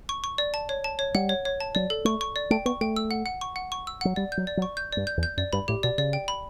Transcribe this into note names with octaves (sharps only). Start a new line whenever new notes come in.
C#6
C#6
D5
A5
C#5
A5
C#5
G3 F#5
C#5
C#5
A5
F#3 D5
A4
A3 C#6
C#6
D5
A3 G5
B3 C#6
A3 G5
E6
F#5
F#5
C#6
F#5
C#6
E6
F#3 F#5
G3 D5
G6
F#3
D5
F#3
C#6
G6
G2 D5
G6
E2
G6
F#2 D5
G2 B5
A2 G4
B2 D5
C#3 D5
G5
B5